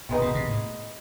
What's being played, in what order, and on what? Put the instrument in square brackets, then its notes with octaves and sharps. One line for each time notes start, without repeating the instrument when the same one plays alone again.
[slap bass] B2 [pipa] D#3 G#3 B3 D#4
[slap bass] B2
C3
A2